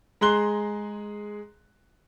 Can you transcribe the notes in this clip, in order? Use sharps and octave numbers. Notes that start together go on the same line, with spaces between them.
G#3 G#4 A#5 C6 F#6 G7